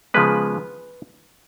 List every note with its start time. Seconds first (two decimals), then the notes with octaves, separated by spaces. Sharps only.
0.14 C#3 F3 G#3 B3 B4